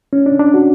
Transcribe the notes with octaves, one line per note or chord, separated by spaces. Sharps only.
C#4
D4
D4
F#4